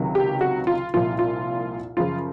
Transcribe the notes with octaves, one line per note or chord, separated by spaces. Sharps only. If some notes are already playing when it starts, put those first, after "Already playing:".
Already playing: C#2 C3 D#3 F#3
G4
F#4
F4
C2 A#2 F3 F4
F4
F#2 C#3 F3 F4